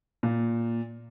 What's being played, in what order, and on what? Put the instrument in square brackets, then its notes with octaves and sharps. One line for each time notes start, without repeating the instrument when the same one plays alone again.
[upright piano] A#2